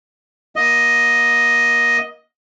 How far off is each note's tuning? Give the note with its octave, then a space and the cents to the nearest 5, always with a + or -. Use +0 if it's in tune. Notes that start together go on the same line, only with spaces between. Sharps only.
A#3 +35 D#5 +5